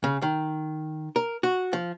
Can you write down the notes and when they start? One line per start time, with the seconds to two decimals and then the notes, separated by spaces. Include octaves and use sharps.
0.04 C#3
0.22 D#3
1.16 A#4
1.43 F#4
1.73 F3